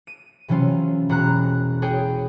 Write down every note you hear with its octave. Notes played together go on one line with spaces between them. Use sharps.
D#7
C3 E3 F#3 C#4 F4
E1 F#4 A#5 F#6
F#4 G#4 C#5 G5